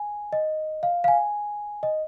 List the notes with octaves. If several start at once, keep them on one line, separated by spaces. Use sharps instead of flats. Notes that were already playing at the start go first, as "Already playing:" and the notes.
Already playing: G#5
D#5
F5
F5
G#5
D#5